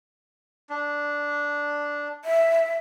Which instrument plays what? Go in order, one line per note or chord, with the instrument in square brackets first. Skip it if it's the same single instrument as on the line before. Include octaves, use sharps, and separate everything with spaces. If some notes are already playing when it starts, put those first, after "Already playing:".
[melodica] D4
[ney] E5